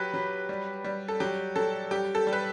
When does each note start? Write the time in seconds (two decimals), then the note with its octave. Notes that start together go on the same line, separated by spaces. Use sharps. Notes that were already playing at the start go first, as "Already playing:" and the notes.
Already playing: F#3 G4 B4
0.14 F#3
0.49 G3
0.84 G3
1.08 A4
1.20 F#3 G4
1.56 F#3 A4
1.91 G3 G4
2.15 A4
2.27 G3
2.33 B4